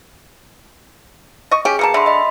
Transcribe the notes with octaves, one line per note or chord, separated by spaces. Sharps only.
D#5 C#6
C#4 G4 G#4
B2 A#3 A5 C#7
D3 E5 B5 C6
D#5 B5